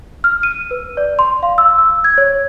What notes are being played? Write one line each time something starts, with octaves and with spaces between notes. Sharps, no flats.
F6
D#7
B4
D5
C6
F5
E6
E6
G#6
C#5